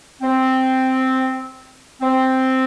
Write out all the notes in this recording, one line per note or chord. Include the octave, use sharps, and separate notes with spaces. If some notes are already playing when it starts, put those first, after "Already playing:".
C4
C4